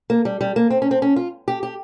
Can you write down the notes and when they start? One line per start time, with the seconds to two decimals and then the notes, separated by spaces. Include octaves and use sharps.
0.10 A#3
0.25 G3
0.41 G3
0.56 A#3
0.70 C4
0.82 C#4
0.91 C4
1.02 C#4
1.16 F4
1.48 G4
1.63 G4